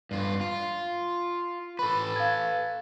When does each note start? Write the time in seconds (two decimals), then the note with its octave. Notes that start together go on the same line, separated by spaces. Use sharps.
0.11 G2 F4
0.41 F4
1.79 A4 B4 B5
2.16 F5 G#6